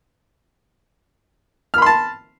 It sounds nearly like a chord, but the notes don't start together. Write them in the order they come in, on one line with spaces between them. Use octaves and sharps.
F6 B5 C6 A5